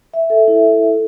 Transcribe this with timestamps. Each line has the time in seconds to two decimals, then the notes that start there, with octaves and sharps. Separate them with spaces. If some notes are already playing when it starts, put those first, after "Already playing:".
0.14 E5
0.30 A4
0.48 E4
0.66 E4
0.83 A4